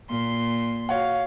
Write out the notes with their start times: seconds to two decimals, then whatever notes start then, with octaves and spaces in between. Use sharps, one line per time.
0.11 A#2 C6
0.89 F#4 C#5 F5 F#5